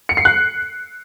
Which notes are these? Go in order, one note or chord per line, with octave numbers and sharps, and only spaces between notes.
C#7
C7
F#6